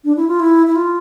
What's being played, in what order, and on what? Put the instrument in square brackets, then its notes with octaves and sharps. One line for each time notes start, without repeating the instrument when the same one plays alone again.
[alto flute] D4
E4
F4
E4
E4
F4